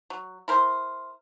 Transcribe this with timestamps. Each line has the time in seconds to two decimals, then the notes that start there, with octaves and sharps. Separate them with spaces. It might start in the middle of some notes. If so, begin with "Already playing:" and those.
0.10 F#3
0.48 E4 A#4 C5